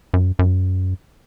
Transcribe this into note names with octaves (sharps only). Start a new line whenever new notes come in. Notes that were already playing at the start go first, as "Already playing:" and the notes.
F#2
F#2